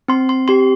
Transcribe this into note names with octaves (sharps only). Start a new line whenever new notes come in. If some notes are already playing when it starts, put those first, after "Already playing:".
C4 C6
C6
G4 C6